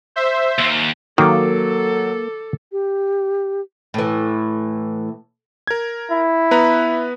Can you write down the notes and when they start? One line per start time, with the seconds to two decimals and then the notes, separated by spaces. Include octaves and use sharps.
0.16 C5 E5
0.59 D#2 A#3
1.18 D#3 F#3 A#3 A4 D6
2.72 G4
3.94 A2 E3
5.67 A#4 G#6
6.11 E4
6.51 B3 B4 A#5